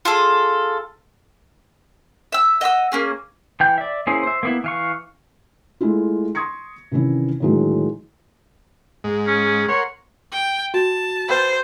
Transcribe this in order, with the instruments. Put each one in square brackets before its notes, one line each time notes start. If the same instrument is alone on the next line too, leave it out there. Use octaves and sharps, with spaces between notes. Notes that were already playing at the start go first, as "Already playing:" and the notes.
[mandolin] F4 G#4 A4
E5 E6
D#5 F#5 B5 E6
A#3 C#4 G#4
[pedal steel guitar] E3 G5 G6
D5 E5
A#3 C#4 E4 G#4 C5
C5 E5
A#3 B3 E4
E3 F5 C#6
[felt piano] G#3 A3 E4 F4
C6 C#6 D#6 G#6 A#6 C#7
C3 D#3 E3 C#4 E4
A2 D3 D#3 F#3 G#3
[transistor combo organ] G#2 G#3
[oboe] C#4
[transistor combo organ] A#4 F#5 C6 [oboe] C#5
[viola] G5
[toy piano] F#4 [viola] A5
[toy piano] B4 G5 B5 [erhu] C5